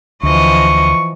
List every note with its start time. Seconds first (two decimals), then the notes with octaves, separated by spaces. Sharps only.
0.23 D2 E3 F3 D#5 C#6